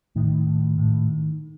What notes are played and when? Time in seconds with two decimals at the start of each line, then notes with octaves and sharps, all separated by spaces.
0.16 A2 D#3
0.47 A2
0.78 A2